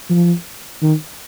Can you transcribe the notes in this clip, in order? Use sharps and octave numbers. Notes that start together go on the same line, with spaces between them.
F3
D#3